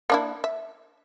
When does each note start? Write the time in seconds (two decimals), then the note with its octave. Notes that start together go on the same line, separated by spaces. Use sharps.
0.10 A#3 D4 E4
0.44 E5